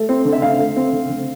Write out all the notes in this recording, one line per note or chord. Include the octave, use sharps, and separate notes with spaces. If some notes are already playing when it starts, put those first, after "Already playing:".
Already playing: A3
C4
D3
E5
D3 F5
A3
C4
D3
D3